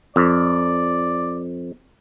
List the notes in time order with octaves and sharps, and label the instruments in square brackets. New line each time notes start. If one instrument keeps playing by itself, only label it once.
[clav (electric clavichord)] F2 [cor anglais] D5